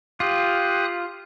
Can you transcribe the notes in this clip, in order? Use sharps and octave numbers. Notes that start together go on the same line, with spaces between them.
F4 G4 D#6 F#6